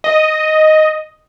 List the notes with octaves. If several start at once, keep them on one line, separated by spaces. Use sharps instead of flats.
D#5